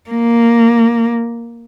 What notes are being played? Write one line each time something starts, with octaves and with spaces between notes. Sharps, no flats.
A#3